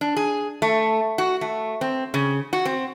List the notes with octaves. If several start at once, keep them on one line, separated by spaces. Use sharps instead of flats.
D4
G#4
A3
F#4
A3
C4
C#3
F#4
C4